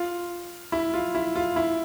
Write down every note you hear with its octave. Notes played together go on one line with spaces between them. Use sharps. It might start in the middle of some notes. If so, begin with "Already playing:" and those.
Already playing: F4
E4
F4
E4
F4
E4